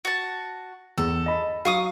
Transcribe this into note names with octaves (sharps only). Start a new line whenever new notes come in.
F#4 A5
E2 A4
D#5 B5
F#3 F5 C#6 D#6